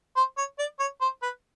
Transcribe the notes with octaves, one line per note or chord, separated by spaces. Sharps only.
C5
C#5
D5
C#5
C5
B4